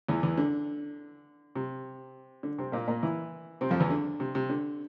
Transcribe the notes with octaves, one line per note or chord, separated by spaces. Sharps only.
E2 E3
E2 E3
D3
C3
D3
C3 C4
A#2 A#3
A#2 A#3
E3 E4
C3 C4
F2 F3
E2 E3
D3
C3
C3
D3